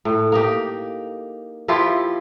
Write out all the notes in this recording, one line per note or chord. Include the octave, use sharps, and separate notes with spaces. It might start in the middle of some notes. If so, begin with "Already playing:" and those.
A2
A#3 D#4 G4
F3 E4 F4 G4